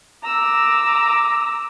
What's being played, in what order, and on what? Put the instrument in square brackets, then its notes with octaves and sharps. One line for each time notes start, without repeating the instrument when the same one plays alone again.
[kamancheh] A#5 E6 [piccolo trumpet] D6